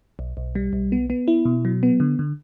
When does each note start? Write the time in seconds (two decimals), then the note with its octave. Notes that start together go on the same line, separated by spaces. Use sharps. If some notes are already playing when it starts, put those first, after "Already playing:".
0.19 B1
0.37 B1
0.55 G3
0.73 B1
0.92 B3
1.10 B3
1.28 E4
1.45 B2
1.65 F#3
1.83 B3
2.00 D3
2.19 D3